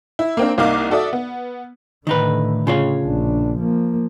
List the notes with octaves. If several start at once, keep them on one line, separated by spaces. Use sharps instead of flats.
E4
A#3 C4 D4
C2 A#3 D#4 F5 D6
F#4 A4 D5 E5 D#6
B3
A2 D3 D#3 D#4 B4
C#3 F4 C#5
A#1 D4
F3 A#3